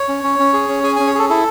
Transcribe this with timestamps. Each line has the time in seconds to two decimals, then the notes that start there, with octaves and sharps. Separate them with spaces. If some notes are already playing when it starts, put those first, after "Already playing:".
Already playing: C#5
0.09 C#4
0.24 C#4
0.39 C#4
0.54 G#4
0.69 C#4
0.83 G#4 G#5
0.96 C#4 G#5
1.07 C#5
1.15 G#4 A4
1.30 E4 A4